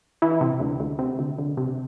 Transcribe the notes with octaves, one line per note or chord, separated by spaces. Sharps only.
E3
C3
D2
D2
C3
D2
D2
C3